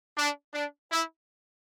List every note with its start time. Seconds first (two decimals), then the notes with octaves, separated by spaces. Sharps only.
0.17 D4
0.54 D4
0.91 E4